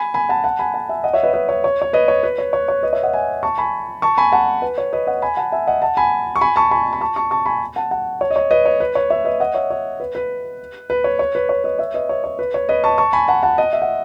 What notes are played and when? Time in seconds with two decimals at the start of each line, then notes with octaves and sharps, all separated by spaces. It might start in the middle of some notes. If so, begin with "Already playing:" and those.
Already playing: G#5 B5
0.14 G#5 B5
0.29 F#5 A5
0.44 F#5 A5
0.59 G#5 B5
0.74 F#5 A5
0.89 E5 G#5
1.04 D#5 F#5
1.14 C#5 E5
1.23 B4 D#5
1.33 B4 D#5
1.49 C#5
1.64 C#5
1.82 C#5
1.93 B4 D#5
2.08 C#5
2.23 B4
2.38 C#5
2.53 C#5
2.68 C#5
2.83 B4 D#5
2.93 C#5 E5
3.03 D#5 F#5
3.13 E5 G#5
3.43 A5 C#6
3.58 G#5 B5
4.02 A5 C#6
4.18 G#5 B5
4.32 F#5 A5
4.62 B4
4.78 C#5
4.93 B4 D#5
5.07 D#5 F#5
5.22 G#5 B5
5.37 F#5 A5
5.52 E5 G#5
5.67 D#5 F#5
5.82 F#5 A5
5.97 G#5 B5
6.36 C#6
6.41 G#5 B5
6.56 A5 C#6
6.71 G#5 B5
6.93 B5
7.01 A5 C#6
7.16 A5 C#6
7.31 A5 C#6
7.46 G#5 B5
7.76 F#5 A5
7.91 F#5 A5
8.21 C#5
8.31 D#5
8.36 C#5
8.51 B4 D#5
8.66 C#5
8.80 B4
8.95 C#5
9.10 C#5 E5
9.25 B4 D#5
9.40 D#5 F#5
9.55 C#5 E5
9.70 C#5
10.00 B4
10.15 B4
10.90 B4
11.04 C#5
11.19 C#5
11.35 B4
11.49 C#5
11.64 B4 D#5
11.79 C#5 E5
11.94 B4 D#5
12.09 C#5
12.24 C#5
12.39 B4
12.54 C#5
12.69 B4 D#5
12.84 A5 C#6
12.98 A5 C#6
13.13 G#5 B5
13.28 F#5 A5
13.43 F#5 A5
13.58 D#5 F#5
13.73 E5
13.82 F#5